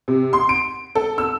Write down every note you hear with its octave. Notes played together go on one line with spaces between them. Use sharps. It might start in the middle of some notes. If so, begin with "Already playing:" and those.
C3
C6
D7
A4
E6